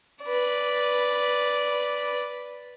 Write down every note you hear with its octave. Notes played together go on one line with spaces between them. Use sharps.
B4 D5